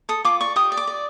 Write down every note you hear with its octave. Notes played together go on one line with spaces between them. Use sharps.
A4 D#6
F4 D6
D5 C#6
G4 D#6
D5
D6
D5